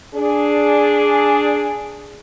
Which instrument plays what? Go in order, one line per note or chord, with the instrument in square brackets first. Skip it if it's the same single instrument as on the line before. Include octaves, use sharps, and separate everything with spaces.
[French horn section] D4 G#4